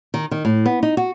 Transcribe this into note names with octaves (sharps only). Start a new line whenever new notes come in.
D#3
D#3
A2
B3
D#4
F#4